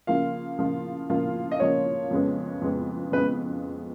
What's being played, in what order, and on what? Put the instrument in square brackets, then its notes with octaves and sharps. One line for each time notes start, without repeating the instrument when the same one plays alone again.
[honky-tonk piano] C#3 F3 A#3 F4 [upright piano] F5
[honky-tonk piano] C#3 F3 A#3 F4
C#3 F3 A#3 F4
[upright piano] D#5
[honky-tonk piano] C#3 F3 A#3 F4 [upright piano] C#5
[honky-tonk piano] F2 C#3 G#3 B3
F2 C#3 G#3 B3
[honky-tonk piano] F2 C#3 G#3 B3 [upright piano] B4